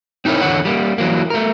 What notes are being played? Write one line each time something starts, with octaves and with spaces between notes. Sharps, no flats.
C4 D#4 E4 A#4 C#5
E2 D3 C#5 F#5
G3 A#3
E3 F#3 A#3
A3 A#4